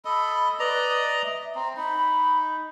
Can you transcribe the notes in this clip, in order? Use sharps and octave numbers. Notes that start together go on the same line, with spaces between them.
A4 D#5 B5
B4 D5 D#5 A#5
E5
C4 A#5
D#4 B5